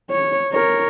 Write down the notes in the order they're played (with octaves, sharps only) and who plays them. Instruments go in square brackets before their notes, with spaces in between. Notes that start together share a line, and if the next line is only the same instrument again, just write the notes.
[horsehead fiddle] C#5
A#4 C#5